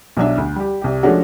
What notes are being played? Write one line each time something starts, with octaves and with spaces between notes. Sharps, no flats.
B1 F#3 D4 E5
D2
G3 G4
C2 G4
F3 G#3 A3 C#4 D4 F#4